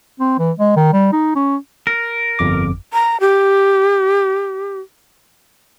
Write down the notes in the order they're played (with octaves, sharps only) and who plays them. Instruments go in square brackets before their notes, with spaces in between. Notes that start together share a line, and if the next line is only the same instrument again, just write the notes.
[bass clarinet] C4
E3
G#3
D#3
G3
D#4
C#4
[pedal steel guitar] A#4
[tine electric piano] G1 F2 D6
[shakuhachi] A#5
G4